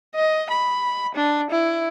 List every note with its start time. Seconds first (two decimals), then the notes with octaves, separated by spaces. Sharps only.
0.15 D#5
0.50 B5
1.15 D4
1.50 E4